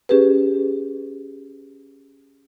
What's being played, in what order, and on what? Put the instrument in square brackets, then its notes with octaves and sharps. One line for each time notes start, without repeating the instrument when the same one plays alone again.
[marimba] C#4 G4 G#4 B4